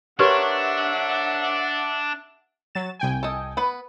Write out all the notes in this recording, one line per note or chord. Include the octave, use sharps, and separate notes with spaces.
D4 G4 A#4 B4 C#5 E5 F#5 C6
F#3 A6 E7
C2 G5 G#5
A4 D#5
B3 B4 B5